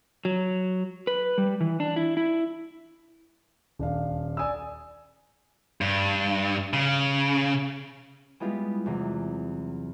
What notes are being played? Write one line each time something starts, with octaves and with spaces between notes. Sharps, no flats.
F#3
B4
G3
E3
D4
E4
E4
D#1 D4 F5
D5 G#5 D#6 E6
G2
C#3
G3 G#3 B3 E4 F4 G4
E2 C3 F#3